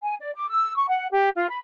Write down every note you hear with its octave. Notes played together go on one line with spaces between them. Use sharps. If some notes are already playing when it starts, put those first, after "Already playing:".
G#5
D5
D6
E6
C#6
F#5
G4
F4
B5